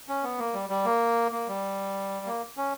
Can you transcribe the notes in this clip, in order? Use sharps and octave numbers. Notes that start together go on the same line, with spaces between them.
C#4
B3
A#3
G3
G3
A#3
A#3
G3
A#3
C#4